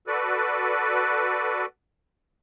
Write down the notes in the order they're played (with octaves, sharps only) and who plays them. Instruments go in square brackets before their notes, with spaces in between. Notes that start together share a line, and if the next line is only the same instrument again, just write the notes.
[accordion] F#4 A4 B4 D5